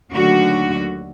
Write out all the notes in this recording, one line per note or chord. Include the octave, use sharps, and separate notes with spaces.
D#2 D3 D#3 F#3 A3 F#4